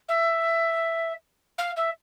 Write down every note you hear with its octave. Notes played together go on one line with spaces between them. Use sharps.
E5
F5
E5